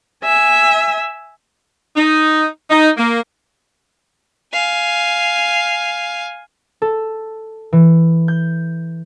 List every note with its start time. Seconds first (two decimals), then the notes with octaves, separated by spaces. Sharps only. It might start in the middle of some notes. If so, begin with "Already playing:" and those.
0.24 E5 G#5
1.96 D#4
2.71 D#4
2.97 A#3
4.53 F5 G#5
6.82 A4
7.73 E3
8.28 G6